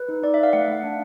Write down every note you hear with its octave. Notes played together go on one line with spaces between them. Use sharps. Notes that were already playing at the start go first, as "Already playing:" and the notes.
Already playing: B4
D#4
D#4 D5
D#4 E5
F5
A3 F#5
A3
D4